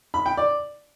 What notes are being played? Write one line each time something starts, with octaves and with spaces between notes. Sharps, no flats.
B5
G5
D5